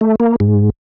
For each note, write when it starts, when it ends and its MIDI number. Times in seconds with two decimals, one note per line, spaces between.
0.01 0.15 57
0.20 0.36 58
0.40 0.70 44